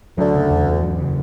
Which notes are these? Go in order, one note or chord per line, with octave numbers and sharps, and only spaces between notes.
D2 D3 F#3
C#3
E2
E2
F#3
C#3